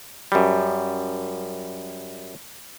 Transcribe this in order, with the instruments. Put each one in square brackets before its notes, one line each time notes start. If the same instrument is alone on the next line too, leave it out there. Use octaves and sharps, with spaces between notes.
[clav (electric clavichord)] F#2 G3